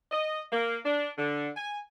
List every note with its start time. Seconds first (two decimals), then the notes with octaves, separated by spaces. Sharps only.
0.12 D#5
0.52 A#3
0.85 D4
1.18 D3
1.57 G#5